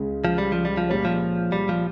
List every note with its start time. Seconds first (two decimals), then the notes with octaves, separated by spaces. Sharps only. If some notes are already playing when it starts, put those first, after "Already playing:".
Already playing: C#2 C#3 G#3
0.25 F3
0.38 G3
0.52 F3
0.65 G3
0.77 F3
0.89 A#2 G3 G#3 C#4
1.05 F3
1.52 G3
1.69 F3